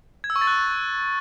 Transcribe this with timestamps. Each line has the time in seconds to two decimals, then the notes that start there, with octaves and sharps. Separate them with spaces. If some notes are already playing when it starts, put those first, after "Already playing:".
0.24 G#6
0.30 E6
0.36 C#6
0.41 A6
0.47 F#6